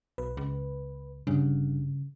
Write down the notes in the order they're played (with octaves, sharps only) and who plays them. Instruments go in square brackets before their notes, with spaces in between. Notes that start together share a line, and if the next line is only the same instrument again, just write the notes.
[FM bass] B1 [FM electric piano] B4
[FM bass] C#2
[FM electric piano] G1 G2 [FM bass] C#3